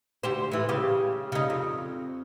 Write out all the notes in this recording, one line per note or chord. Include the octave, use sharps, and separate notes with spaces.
D2 G4 C5
A2 E3
C#3 G4
C#3 D#4
F2